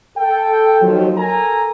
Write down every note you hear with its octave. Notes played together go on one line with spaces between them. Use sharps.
A4 G5
D#2 D#3 F3 F#3
A4 A#4 G#5 A#5